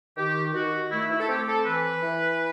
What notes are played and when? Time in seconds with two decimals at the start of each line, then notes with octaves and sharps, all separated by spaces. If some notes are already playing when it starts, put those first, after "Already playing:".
0.17 D#3 G4
0.54 D#3 F#4
0.92 A3 E4
1.10 E4
1.20 A4
1.29 C4 G4
1.48 A4
1.66 E3 B4
2.03 E3